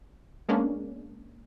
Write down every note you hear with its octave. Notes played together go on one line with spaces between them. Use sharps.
G#3 A#3 B3 C#4 D4